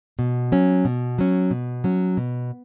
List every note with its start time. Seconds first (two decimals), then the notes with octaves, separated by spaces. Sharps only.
0.19 B2
0.52 F#3 C#4
0.85 B2
1.18 F#3 C#4
1.51 B2
1.84 F#3 C#4
2.17 B2